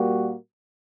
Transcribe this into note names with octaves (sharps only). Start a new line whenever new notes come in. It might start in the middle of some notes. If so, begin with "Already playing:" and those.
Already playing: A#2 G3 A#3 F#4